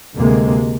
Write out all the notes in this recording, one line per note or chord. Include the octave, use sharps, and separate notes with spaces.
D2 C3 G#3 A#3